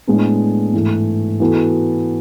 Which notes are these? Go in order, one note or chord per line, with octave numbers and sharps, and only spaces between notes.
A2 G#3 B3 D4
G#2 E3 A3
E3 B3 F#4 A4